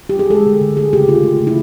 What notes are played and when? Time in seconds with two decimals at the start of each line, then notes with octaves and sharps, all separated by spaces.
0.09 G4
0.19 G#4
0.30 G#3 A4
0.46 D3
0.61 D3
0.76 A3 G#4
0.93 C#3 G4
1.08 C#3 F4
1.23 A3
1.40 C#3
1.47 E4